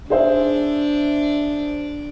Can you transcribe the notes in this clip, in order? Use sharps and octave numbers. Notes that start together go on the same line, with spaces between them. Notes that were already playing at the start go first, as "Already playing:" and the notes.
D4 G#4 C5 E5